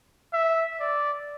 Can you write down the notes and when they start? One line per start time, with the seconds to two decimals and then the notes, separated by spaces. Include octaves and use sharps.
0.33 E5
0.79 D5